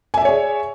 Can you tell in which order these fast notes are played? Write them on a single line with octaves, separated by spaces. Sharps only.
G#5 E5 D5 C#5 G#4